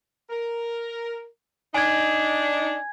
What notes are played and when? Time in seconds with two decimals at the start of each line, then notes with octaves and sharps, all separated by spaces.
0.30 A#4
1.75 D4 D#4 G#5 G#6